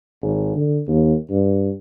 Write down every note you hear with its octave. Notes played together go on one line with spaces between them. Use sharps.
G#1
D3
D#2
G2